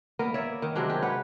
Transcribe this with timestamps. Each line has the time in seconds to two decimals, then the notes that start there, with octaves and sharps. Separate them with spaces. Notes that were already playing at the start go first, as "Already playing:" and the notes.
0.19 A#3 B3 A#4 D#5
0.34 C#5 D5 E5
0.62 D#3
0.76 C3 F#3 G#3 D4
0.90 G#3 G4
1.02 B4 C#5 F#5